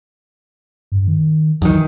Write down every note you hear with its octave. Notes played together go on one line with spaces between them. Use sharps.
G2
D#3
E2 D#3 F#3